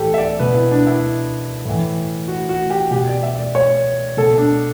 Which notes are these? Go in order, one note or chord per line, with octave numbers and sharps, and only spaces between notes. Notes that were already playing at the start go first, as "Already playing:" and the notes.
Already playing: A2 E3 G4 A4
E5
D5
B2 B4
E4
D4
E4
A2 E3
F#4
F#4
G4
B2 G4
D5
E5
D5
C#5
B2 A4
D4